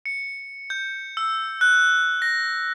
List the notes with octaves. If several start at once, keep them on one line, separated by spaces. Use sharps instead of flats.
C#7
G6
E6
F#6
A#6